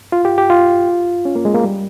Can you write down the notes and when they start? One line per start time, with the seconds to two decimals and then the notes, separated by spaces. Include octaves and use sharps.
0.12 F4
0.25 G4
0.38 G4
0.50 F4
1.25 C#4
1.36 A#3
1.45 G#3
1.54 A#3
1.64 G3